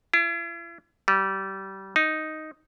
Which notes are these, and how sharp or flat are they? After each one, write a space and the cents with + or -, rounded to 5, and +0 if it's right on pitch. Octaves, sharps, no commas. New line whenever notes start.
E4 +45
G3 -25
D#4 +0